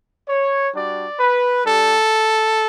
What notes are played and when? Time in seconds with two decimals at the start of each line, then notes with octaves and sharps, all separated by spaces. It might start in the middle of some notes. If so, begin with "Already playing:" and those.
0.29 C#5
0.74 G3 D4 F#4 D5
1.20 B4
1.65 G3 D4 G4 A4